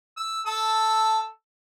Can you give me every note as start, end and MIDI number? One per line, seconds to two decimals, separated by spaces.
0.17 0.40 88
0.47 1.28 69
0.47 1.28 81
0.47 1.28 88